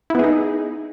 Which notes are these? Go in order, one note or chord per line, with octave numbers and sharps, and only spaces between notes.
B3 D#4 E4 G#4